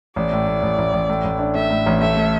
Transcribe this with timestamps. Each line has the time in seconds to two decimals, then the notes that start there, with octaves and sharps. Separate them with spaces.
0.16 A1 D5
0.32 A2
0.47 A2
0.63 A1
0.78 A1
0.93 A1
1.09 A2
1.24 A1
1.39 D4
1.55 A3 E5
1.70 A2
1.86 A1
2.01 A3 E5
2.17 A3